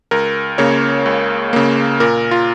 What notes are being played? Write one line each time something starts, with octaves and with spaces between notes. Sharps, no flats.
C#2 A#4
C#3 A#3 C#5
C#2
C#3 A#3
A#2 A#4
F4